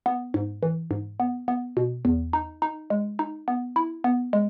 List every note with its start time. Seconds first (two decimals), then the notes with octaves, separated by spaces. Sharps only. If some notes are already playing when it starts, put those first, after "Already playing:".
0.06 B3
0.34 G#2
0.63 E3
0.91 G#2
1.20 B3
1.48 B3
1.77 B2
2.05 E2
2.33 D#4
2.62 D#4
2.90 G#3
3.19 D#4
3.48 B3
3.76 E4
4.04 B3
4.33 G#3